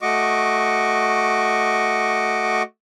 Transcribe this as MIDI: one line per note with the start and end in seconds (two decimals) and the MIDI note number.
0.02 2.62 57
0.02 2.62 66
0.02 2.62 75
0.02 2.62 85
0.02 2.62 86